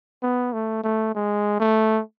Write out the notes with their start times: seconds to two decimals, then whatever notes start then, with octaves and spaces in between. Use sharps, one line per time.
0.23 B3
0.53 A3
0.84 A3
1.15 G#3
1.60 A3